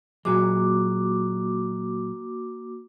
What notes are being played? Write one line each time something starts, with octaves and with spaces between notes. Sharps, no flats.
A#2 F#3 G#3 A#3 F#4 D6